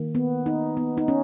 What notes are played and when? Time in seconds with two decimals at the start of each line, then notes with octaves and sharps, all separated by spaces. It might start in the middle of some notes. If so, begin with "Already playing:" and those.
Already playing: D#3 A#3
0.15 B3
0.46 D#4
0.77 B3
0.97 D#4
1.08 C#4